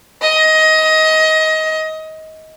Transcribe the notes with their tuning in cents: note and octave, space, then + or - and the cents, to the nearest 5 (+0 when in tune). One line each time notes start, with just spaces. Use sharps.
D#5 +20